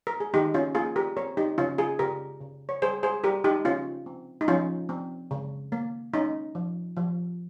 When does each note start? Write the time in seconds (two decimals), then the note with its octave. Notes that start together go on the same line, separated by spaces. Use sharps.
0.07 A#4
0.20 G#4
0.34 D#3 D#4 G4
0.54 C#4 F4
0.75 A#3 F4 G#4
0.96 G4 A#4
1.17 C4 A#4 C#5
1.37 D#4 G4
1.58 C#3 C#4 F4
1.78 F4 G#4
1.99 C#3 G4 A#4
2.41 C#3
2.69 C#5
2.82 G3 G#4 C5
3.03 G#4 C5
3.24 G3 G4 A#4
3.44 D#4 G4
3.65 C#3 C#4 F4
4.06 C4
4.41 D#4
4.48 F3 C#4 F4
4.89 C4
5.31 C#3
5.72 A#3
6.14 C#4 D#4
6.55 F3
6.97 F3